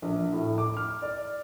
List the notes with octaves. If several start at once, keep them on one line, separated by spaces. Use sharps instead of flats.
A#1
A2
D6
F6
D5